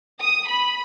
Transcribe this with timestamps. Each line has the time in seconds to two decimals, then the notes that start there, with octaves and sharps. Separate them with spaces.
0.21 D#6
0.49 B5